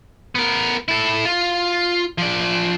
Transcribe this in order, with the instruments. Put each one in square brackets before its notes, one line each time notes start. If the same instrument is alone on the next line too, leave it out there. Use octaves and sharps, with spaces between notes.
[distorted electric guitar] B3 A#4
E4 A4
F4
F3 D5